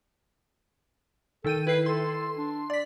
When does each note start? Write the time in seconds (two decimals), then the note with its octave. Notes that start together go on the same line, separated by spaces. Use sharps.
1.44 D#3 A4 G5 D#7
1.67 E4 B4 C7
1.86 A4 C6
2.37 D4
2.70 D5 B6